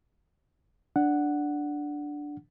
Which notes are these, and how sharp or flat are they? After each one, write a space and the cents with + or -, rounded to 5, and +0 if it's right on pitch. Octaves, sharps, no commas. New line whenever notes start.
D4 +0 F#5 +0